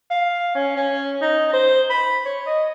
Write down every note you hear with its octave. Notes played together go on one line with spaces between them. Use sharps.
F5
C#4
C#4
D#4
C5
B5
C#5
D#5